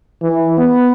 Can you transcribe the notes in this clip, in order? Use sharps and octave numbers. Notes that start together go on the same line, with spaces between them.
E3
B3